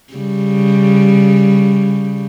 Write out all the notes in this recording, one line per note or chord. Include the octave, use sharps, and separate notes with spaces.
C#3 G3